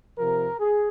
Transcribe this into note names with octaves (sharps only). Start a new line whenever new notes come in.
C3 F3 A#4
G#4